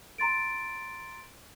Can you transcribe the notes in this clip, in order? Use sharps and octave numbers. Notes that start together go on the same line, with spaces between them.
A#5 C6 A6 D7